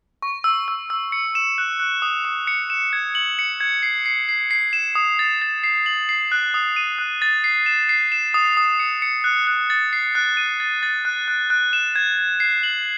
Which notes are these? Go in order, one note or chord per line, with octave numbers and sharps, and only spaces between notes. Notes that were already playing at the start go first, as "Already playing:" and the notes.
C#6
E6
E6
E6
C#7
E7
F#6
F#6
D#6
D#6
C#7
E7
G#6
F#7
C#7
G#6
C7
C7
C7
C7
E7
D#6
A6
A6
C7
F#7
C7
F#6
D#6
D#7
F#6
A6
C7
E7
C7
E7
D#6
D#6
C#7
C#7
F#6
F#6
A6
C7
F#6
D#7
A6
A6
F#6
F#6
F#6
E7
G#6
G#6
C7
F#7